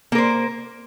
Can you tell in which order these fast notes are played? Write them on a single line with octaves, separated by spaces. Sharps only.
A#3 A#4 C5